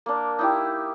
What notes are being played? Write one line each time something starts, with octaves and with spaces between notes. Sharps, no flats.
A#3 D4
D#4 E4 G4